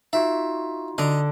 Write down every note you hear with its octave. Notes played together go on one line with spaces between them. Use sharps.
D#4 F4 F#4 E5
D3 D#5 A#5